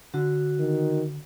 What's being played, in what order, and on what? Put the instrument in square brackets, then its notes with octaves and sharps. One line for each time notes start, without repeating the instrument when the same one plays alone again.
[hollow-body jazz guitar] D3 [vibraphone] F#4
[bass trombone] D#3